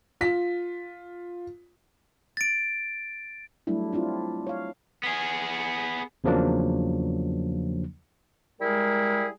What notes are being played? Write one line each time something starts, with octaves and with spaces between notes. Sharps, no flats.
F4 B6
A6 D7
F#3 G3 A3 D4 E4
C4 D4 E4 F4
C#5 F5
B3 G#4
E2 C#3 F3 F#3 A#3 D4
G3 G#3 E4 G#4 A#4